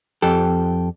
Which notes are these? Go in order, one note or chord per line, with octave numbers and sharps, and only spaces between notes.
F2 G4 A4